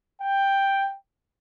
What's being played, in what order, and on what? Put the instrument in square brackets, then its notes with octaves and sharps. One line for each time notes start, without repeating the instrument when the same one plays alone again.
[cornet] G5